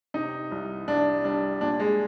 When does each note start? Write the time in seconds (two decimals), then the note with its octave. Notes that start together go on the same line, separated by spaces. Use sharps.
0.14 C3 D#4
0.52 C2
0.88 C2 D4
1.24 G3 D4
1.61 A#2 D4
1.80 G#3